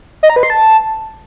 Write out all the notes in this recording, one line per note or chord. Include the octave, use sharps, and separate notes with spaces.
D#5
A#5
B4
C6
A5